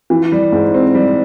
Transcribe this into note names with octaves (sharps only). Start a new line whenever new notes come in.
E3
G3
G#2
C4
G3